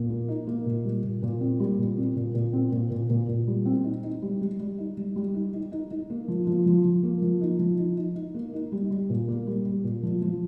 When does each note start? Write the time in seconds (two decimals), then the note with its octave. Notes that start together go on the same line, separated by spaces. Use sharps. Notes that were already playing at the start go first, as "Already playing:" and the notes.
Already playing: A#2
0.10 A#3
0.28 D#4
0.47 A#3
0.66 A#2
0.85 G3
1.03 A#2
1.23 A#2
1.41 C4
1.60 G3
1.78 A#2
1.97 C4
2.16 A#2
2.34 A#2
2.53 C4
2.72 A#2
2.91 A#2
3.10 A#2
3.28 A#2
3.47 G3
3.65 C4
3.84 D#4
4.03 D#4
4.22 G3
4.41 G3
4.60 G3
4.78 D#4
4.97 G3
5.16 G3
5.34 D#4
5.54 D#4
5.72 D#4
5.91 D#4
6.10 A#3
6.28 F3
6.47 F3
6.66 F3
6.84 F3
7.03 A#3
7.22 F3
7.41 D#4
7.59 F3
7.78 D#4
7.97 D#4
8.15 D#4
8.34 A#3
8.53 D#4
8.72 G3
8.90 G3
9.09 A#2
9.28 A#3
9.47 G3
9.65 G3
9.84 A#2
10.03 F3
10.22 F3